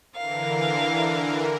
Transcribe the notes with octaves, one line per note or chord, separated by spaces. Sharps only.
D3 E3 A#4 F5